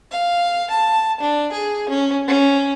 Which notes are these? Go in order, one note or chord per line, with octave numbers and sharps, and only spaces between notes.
F5
A5
D4
G#4
C#4
C#4